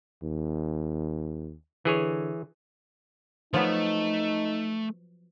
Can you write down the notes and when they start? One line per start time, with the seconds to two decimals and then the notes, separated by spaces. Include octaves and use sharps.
0.23 D#2
1.85 D3 E3 G#4 C#5
3.54 F3 F#3 A3 B3 D#4